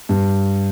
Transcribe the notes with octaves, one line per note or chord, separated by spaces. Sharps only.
G2